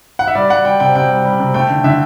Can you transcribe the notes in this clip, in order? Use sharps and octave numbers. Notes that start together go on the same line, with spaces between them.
F#5
E5
G3 D5
G3 F#5
G3 G5
C3 G5
C3 G5
G3
G3
C3
A3 G5
D3
D3 E5